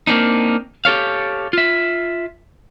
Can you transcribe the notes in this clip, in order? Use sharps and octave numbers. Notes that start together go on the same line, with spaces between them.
A#3 C4 D4 D#4
G4 A4 C#5 F5
F4 E5